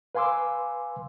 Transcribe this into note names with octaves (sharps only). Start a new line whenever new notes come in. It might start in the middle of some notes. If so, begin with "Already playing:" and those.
B4 F5 G#5 C6 D6 E6